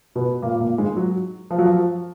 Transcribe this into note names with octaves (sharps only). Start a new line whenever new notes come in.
B2 B3
A#2 A#3
A#2 A#3
G#2 G#3
F#3
F3
F#3
F3